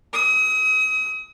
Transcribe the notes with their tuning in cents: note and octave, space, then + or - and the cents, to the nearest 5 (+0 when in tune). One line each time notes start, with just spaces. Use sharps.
D#6 +40